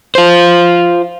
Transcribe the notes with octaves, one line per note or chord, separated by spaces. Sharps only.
F4 C5